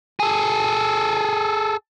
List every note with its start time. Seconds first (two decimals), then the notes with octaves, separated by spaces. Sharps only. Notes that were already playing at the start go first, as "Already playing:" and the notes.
0.20 G#4 A4